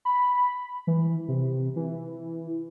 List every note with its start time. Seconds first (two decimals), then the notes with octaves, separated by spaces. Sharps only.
0.05 B5
0.87 E3
1.28 C3
1.76 E3